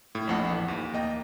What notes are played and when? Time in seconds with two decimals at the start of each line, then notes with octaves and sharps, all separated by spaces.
0.15 A2
0.27 A#1 F2 F#5
0.50 E3
0.68 D#2
0.94 A#3 D#5 G5